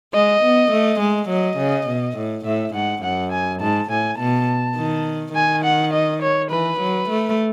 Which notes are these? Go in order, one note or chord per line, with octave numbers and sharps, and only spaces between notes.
G#3 D#5
B3
A3
G#3
F#3 D#5
C#3
B2
A2
A2 E5
G#2 F#5
F#2 F#5
G#5
G#2 A5
A2 G#5
B2 A5
D#3
D#3 G#5
F#5
D#5
C#5
E3 B4
F#3
A3